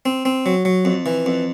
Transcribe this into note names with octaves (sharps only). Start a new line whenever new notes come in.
C4
C4
F#3
F#3
F2
E3
F2